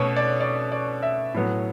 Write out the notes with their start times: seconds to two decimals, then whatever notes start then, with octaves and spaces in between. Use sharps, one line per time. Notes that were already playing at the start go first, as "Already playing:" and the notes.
Already playing: B2 A3 C#4 B4 C#5
0.16 D5
0.41 D5
0.72 D5
1.03 E5
1.34 A2 F#3 B3